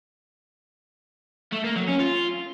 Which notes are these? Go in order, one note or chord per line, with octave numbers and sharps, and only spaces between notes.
A3
A#3
F#3
C#4
F4